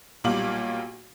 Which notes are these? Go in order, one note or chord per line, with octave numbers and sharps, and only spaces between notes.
B1 A#2 G3 F5 D6 F#7